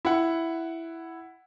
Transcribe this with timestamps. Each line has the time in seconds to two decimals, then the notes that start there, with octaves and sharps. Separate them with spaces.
0.05 E4 F#5